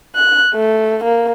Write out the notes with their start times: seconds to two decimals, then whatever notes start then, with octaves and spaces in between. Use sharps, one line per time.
0.15 F#6
0.54 A3
1.04 A#3